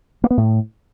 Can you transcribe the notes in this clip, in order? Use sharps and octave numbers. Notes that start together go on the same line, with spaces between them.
A#3
B3
A2